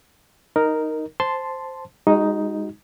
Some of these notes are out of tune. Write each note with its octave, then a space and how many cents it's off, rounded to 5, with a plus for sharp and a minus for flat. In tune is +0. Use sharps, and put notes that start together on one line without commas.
D#4 +0 A#4 +0
C5 +0 A5 +0 C6 -5
G#3 -30 D#4 +5 F#4 +0